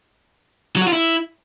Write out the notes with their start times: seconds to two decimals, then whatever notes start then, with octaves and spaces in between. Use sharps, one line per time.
0.76 F#3
0.82 F#4
0.87 F4
0.93 E4